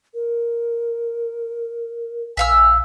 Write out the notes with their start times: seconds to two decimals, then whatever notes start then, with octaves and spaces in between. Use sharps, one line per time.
0.14 A#4
2.37 A#1 E5 F5 G#5 E6